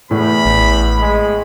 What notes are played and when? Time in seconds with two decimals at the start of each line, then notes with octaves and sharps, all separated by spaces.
0.11 E2 A2 B5
0.45 A1
1.00 G#3